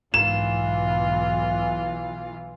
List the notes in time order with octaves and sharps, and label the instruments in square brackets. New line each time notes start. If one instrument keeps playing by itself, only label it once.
[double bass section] B1 E3 [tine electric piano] G#2 [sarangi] F4 [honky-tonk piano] E7